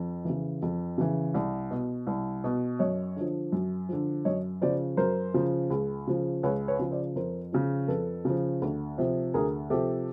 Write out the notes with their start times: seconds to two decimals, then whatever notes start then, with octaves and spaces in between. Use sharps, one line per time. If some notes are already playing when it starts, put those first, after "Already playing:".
Already playing: F2
0.25 C#3 E3
0.62 F2
0.98 C#3 E3
1.34 C2
1.71 B2
2.07 C2
2.44 B2
2.79 F#2 C#5 D#5
3.17 D3 F3
3.52 F#2
3.89 D3 F3
4.25 F#2 C#5 D#5
4.61 C#3 F3 C5 D5
4.97 F#2 A#4 C5
5.34 C#3 F3
5.70 C#2
6.07 C#3 F3
6.43 C#2 B4 C#5
6.68 B4 C#5
6.79 C#3 F3
6.91 C5 D5
7.15 F2 A#4 C5
7.53 C#3 F3
7.88 F2 A4 B4
8.25 C#3 F3
8.62 D2
8.98 C3 F3
9.34 D2 G#4 A#4
9.70 C3 F3 G4 A4